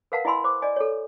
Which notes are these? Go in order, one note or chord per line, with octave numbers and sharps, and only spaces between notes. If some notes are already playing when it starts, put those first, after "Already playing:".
A#4 B4 F5 F#5 A5
E4 D#5 G#5 B5 C6 E6
C5 D6
D5 D#5 G#5
A4 C#5